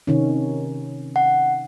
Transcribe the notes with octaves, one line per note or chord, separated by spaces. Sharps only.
C3 D#3 C#4
F#5